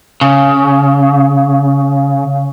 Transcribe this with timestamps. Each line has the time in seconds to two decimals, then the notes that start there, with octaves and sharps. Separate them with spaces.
0.21 C#3